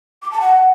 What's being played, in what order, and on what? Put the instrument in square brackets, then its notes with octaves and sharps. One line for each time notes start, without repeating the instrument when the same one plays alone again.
[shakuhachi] D6
A5
F#5